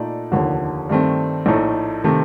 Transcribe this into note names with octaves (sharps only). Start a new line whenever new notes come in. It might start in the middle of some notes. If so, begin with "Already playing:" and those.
Already playing: A#2 A3 D#4 A4 D5
F1 D#2 D3 F3
G2 D#3 A3 C4
A#1 A2 A3 D#4 A4
C3 D#3 A3 C4